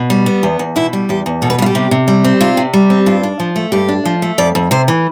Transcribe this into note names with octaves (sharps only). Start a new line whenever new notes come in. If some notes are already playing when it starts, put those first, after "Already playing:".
Already playing: B2
G3
B3
E2
E2
B2 E4
G3
E2 G4
E2
B2 A4
B4
G3 F4
G4
C3
C3
G3
C4
C3 F4
C3
G3
C4
G2 F4
D4
F3
A3
G2 G4
D4
F3
A3
F2 D5
F2
C3 C5
E3